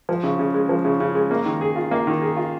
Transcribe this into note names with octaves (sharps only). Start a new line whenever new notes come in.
F3
C#3
C#3
G#3
F3
C#3
C#3
G#3
A#3
D#3
G#4
F4
A#3
D#3
G#4
F4